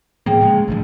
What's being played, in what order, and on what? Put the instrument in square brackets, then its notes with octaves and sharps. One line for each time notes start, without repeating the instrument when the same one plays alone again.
[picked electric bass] A2 F3 A#3 [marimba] G#4 G5
[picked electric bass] C#3 G#3 [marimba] A3
[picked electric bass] A1 G2 F3